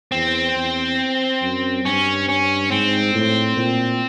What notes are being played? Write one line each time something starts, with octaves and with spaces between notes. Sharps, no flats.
E2 C4
E2
F#2
G2 C#4
C#4
G#2 C4
A2
A#2